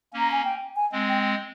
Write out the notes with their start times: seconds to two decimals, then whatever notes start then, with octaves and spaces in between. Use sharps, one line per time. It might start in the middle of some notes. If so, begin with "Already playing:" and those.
0.13 A#3 C#4
0.19 A#5
0.32 G#5
0.44 G5
0.76 G#5
0.92 G#3 C4
1.09 G5